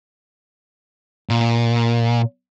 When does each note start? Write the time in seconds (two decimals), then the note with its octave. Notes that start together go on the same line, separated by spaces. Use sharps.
1.29 A#2